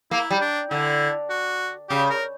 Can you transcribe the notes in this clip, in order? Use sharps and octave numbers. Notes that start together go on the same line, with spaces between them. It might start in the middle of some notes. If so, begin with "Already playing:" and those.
A#3 E4
G3
D4
D3 E4
F#4
C#3 G4
A#4